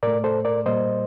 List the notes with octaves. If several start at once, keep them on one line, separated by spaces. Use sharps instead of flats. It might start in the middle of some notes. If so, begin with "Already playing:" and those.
A2 A3 A#4 D5
A4 C5
A#4 D5
A#2 G3 A#3 C5 D#5